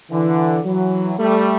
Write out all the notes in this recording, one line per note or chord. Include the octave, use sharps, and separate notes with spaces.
D3 E3
E3 F#3
G3 A3